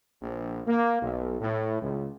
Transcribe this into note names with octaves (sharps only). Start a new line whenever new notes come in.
A#1
A#3
B1
A2
C#2